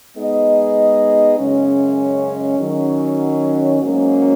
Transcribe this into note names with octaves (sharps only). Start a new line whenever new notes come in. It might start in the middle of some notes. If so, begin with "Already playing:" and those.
G#3 B3 D#4 G#4 D#5
F#2 C#3 G#3 C#4
D#3 F#3 C#4
G#2 F#3 A#3 C#4